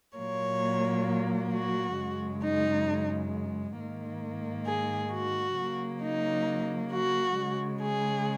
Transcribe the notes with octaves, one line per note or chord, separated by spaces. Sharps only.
A#2 F#3 A#3 C#5
F#4
F#2 C#3 G#3
D#4
G#2 D#3 A#3
G#4
F#4
C#3 F#3 A#3
D#4
F#4
C#3 G#3
G#4